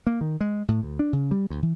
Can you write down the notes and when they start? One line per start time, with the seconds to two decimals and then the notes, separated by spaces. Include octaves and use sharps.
0.07 A#3
0.21 D#3
0.41 G#3
0.68 A2
0.83 D2
0.99 D4
1.13 C#3
1.31 G3
1.50 D2
1.63 E3